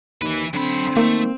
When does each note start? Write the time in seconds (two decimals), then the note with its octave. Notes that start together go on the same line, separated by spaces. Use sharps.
0.22 D#2 E3 B4
0.54 F#2 D3 C4 B5
0.97 D#3 A3 A#3